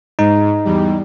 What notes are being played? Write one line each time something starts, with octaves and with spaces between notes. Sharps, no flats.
G#2 D#4
E2 G3